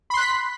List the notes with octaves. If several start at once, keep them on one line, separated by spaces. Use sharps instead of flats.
B5 C6 F#6 B6